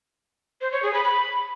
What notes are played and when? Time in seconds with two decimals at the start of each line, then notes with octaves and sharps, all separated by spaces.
0.61 C5
0.72 C#5
0.83 G#4
0.93 B5
1.04 B5